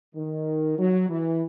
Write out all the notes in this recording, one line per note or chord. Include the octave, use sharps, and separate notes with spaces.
D#3
F#3
E3